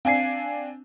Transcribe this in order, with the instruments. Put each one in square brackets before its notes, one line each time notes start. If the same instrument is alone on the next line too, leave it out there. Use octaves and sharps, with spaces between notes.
[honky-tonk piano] C4 D4 G#5 [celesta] F5 C7